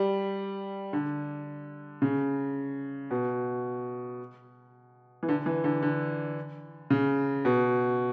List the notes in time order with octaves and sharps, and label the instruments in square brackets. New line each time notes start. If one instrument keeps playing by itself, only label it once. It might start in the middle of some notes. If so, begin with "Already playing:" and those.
Already playing: [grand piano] G3
D3
C#3
B2
E3
D3
E3
D3
D3
C#3
B2